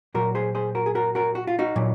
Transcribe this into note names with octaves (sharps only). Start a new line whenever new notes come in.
A#2 F#3 F#4 A#4
G#4 C5
G#4 C5
F#4 A#4
G#4
F#4 A#4
F#4 A#4
F#4
F4
D#4 F#4
A#2 F#3